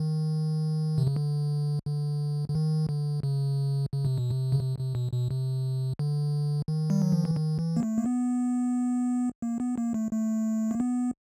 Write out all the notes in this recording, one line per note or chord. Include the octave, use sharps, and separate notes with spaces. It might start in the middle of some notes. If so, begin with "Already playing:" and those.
Already playing: D#3
C3
C#3
D3
D3
D3
D#3
D3
C#3
C#3
C3
B2
C3
C#3
C3
C3
B2
B2
C3
D3
D#3
G3
F#3
F3
E3
D#3
E3
A#3
A3
A#3
B3
A#3
B3
A#3
A3
A3
A#3
B3